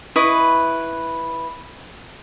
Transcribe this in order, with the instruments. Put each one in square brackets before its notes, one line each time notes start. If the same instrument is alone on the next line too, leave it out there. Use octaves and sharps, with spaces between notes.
[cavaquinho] E4 B4 D#5 C#6